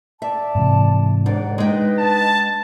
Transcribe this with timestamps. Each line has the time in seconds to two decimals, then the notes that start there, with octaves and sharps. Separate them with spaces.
0.22 D5 E5 A5
0.55 G#2 C3 E3
1.26 D#2 G#2 D4 D5 F#5
1.58 G#3 D#4 B4 G5
1.97 A5